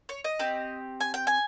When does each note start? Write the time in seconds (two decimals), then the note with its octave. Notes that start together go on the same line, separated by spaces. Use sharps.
0.09 C#5
0.24 D#5
0.39 C4 G4
1.00 G#5
1.14 G5
1.27 G#5